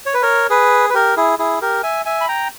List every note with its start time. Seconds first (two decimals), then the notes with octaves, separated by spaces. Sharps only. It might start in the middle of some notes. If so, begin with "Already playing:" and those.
0.06 C#5
0.14 B4
0.22 A#4 C#5
0.50 G#4 B4
0.90 B4
0.94 G4 A#4
1.17 E4 G#4
1.39 E4 G#4
1.61 G4 A#4
1.83 E5 G#5
2.05 E5 G#5
2.21 B5
2.28 G5 A#5